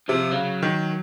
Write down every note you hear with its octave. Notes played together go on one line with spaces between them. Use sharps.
C3 F3
C#3 F#3
D#3